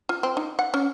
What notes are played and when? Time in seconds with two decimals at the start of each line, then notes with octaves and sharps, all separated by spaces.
0.09 F4
0.23 C4
0.37 D#4
0.59 F#5
0.74 C#4